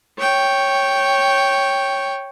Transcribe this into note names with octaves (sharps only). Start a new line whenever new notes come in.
C#5 G5